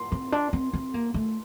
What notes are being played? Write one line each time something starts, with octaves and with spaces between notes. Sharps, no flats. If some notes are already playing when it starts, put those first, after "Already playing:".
Already playing: C6
C4
D4
C4
C4
A#3
A3